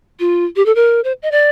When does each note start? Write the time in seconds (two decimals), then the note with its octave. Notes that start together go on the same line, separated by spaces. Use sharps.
0.20 F4
0.56 G4
0.66 A4
0.75 A#4
1.04 C5
1.23 D#5
1.32 D5